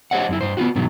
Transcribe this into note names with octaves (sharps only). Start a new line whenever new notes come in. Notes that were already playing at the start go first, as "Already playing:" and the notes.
G4 C5 C#5 D#5 F#5
F#2 C#4 E4
G2 C5
B3 C#4 F4 F#4
G2 B2 D#3 F#3